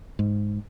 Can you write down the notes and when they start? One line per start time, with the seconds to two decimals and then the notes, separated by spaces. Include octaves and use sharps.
0.19 G#2